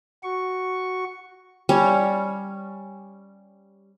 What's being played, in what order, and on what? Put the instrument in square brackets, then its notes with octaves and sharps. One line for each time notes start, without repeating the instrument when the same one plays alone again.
[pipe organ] F#4 C#6
[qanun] G3 C#4